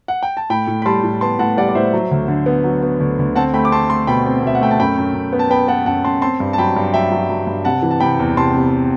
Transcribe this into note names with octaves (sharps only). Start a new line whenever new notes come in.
F#5
G5
A5
A2 G5 B5
A2
B5
G3 A5 C6
A2
B3 A5 C6
A2 F#5 A5
G3 D5 F#5
D5
A2 C5 E5
F#3
D2
D3
B3
F#3
B3
D2
D2
C4 F#5 A5
A3 G5 B5
D6
C4 A5 C6
A3 A5 C6
B2 G5 B5
C4
B2 E5
F#5
A3 G5
A5
F#2 G5 B5
F#2
F#2
B3
A5
B3 G5 B5
B3 F#5 A5
F#2 F#5 A5
F#2 A5 C6
C4 A5 C6
G2
A5
F#3 G5 B5
G2
F#3 E5 G5
F#3
F#3
G2
C3 F#5 A5
E3
A5
C3 G5 B5
E2
C3 A5 C6
C3